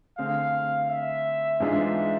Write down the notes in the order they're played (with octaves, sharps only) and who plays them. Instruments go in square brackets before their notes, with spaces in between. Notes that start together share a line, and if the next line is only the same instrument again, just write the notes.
[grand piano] D3 A3 C4 G#4 [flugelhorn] F5
[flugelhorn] E5
[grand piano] G#2 E3 G#3 D4 F4 [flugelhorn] E5